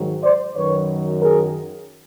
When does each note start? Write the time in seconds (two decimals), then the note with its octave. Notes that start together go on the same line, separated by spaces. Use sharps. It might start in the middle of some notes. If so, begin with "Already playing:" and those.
Already playing: G#2 D#3 F#3
0.22 C5 D5
0.54 F#2 D#3 F#3 B4 C#5
1.20 G#4 A#4